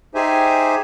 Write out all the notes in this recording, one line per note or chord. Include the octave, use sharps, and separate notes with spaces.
D#4 G4 G#4 C5 E5 G#5